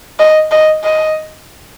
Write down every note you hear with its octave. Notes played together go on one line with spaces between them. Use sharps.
D#5
D#5
D#5